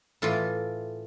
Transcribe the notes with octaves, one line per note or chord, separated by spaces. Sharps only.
A2 E3 F4